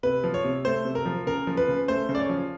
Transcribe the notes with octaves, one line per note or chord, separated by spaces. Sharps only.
C3 B4
F3
C#5
C3
A3 C5
C3
A#4
F3
C#3 A#4
F3
B4
C#3
A3 C5
C#3
D5
C#5
F3